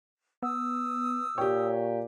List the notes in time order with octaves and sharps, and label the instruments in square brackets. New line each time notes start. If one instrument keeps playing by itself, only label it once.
[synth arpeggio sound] B3 [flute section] D#6 E6
[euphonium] A#2 [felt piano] G4 G5 [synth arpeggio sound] C#5